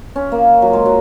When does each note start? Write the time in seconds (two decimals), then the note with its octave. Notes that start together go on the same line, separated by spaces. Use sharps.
0.16 C#4
0.32 A#3
0.62 F#3
0.73 G#3
0.86 F#3